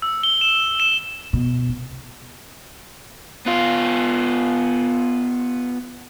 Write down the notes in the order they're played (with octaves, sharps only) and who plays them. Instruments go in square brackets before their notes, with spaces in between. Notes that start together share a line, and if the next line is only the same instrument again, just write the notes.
[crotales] E6
G7
E7
E7
[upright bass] B2
C2
[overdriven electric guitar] B3 F4